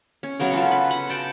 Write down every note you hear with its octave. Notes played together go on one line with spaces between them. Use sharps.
C#4
C#3 F#3 B3 A#4
C#4 F4 A4
B4
F#5
F#4 G5 A5